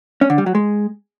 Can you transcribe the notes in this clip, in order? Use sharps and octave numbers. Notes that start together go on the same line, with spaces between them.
C#4
D3
G3
F#3
G#3